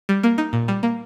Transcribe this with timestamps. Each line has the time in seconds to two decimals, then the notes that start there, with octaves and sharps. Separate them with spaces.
0.09 G3
0.23 A#3
0.38 D#4
0.53 A#2
0.68 G3
0.83 A#3